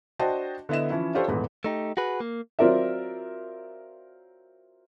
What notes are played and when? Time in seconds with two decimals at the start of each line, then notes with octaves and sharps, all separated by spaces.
0.19 D4 F#4 C5 D#5 G5 A5
0.69 D3 B3 E4 D#5 E7
0.90 E3 F3 C#4 E4
1.14 D4 F4 G4 A4 C5 C#5
1.28 D#1 E2 G#2 B4
1.64 A3 D#4 G4
1.97 F#4 G#4 B4
2.20 A#3
2.59 F#3 C4 F4 A#4 D5 E5